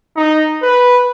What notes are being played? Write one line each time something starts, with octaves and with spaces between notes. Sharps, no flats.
D#4
B4